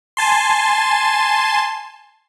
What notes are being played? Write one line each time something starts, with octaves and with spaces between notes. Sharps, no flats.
G#5 A5 C6